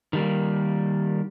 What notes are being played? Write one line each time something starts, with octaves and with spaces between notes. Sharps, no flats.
D#3 G3 A#3